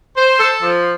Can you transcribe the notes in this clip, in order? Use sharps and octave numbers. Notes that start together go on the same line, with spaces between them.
C5
A4
F3